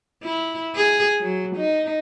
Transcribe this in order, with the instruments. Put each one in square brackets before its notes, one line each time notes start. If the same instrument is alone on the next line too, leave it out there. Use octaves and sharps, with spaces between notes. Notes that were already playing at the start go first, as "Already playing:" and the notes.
[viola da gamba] E4
G#4
F#3
D#4